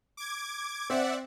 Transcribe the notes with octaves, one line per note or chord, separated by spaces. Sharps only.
D6 G#6
C4 D5 E5 F#5